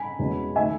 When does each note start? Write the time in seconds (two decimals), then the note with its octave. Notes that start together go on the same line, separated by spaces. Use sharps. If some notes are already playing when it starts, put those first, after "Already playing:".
Already playing: G#5 B5
0.19 E2 B2 G#3 C#4
0.56 D#3 A3 E5 G#5